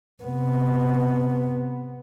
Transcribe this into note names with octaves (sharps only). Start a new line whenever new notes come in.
C3 B3